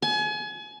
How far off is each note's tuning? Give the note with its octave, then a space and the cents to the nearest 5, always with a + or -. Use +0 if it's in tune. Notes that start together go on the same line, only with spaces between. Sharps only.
G#5 +35